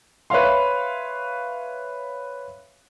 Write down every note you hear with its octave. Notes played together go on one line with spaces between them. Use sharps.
B4 C#5 E5 F5 C6